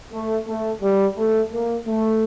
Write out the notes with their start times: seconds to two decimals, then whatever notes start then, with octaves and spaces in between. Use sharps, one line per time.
0.12 A3
0.47 A3
0.82 G3
1.17 A3
1.52 A#3
1.86 A3